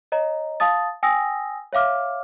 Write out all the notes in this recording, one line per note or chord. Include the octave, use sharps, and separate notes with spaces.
C#5 D#5 A#5
F5 A5 D#6 A6
G5 G#5 D#6 E6 A#6
C#5 E5 F5 D6 F6